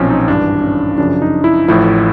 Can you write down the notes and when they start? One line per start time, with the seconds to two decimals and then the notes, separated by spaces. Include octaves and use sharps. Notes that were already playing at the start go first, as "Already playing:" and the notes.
Already playing: B1 A#2 F3 C4 C#4
0.10 D#4
0.28 G#1 G2 E3 D4
0.63 C#4
0.97 F#2 C#3 F3 D4
1.22 D#4
1.44 E4
1.68 A1 A2 F3 E4